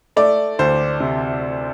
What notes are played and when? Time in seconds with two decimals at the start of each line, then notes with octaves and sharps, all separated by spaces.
0.16 A3 D5
0.59 D2 C5
1.00 C3